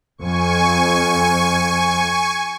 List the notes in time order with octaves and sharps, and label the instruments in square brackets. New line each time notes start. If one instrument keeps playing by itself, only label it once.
[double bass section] F2 [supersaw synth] G#5 C#6